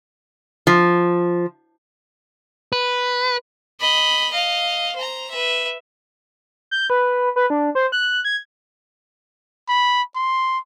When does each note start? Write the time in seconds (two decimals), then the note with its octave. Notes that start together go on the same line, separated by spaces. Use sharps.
0.67 F3
2.73 B4
3.81 D#5 B5
4.32 D#5 F5
4.96 C5 A#5
5.31 B4 E5
6.71 G6
6.90 B4
7.36 B4
7.50 D4
7.75 C5
7.92 F#6
8.25 G#6
9.69 B5
10.15 C6